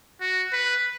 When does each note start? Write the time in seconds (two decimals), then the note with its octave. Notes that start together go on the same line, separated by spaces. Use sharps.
0.21 F#4
0.53 B4